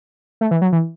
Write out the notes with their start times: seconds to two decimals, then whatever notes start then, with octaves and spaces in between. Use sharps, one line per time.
0.41 A3
0.51 E3
0.62 F#3
0.72 E3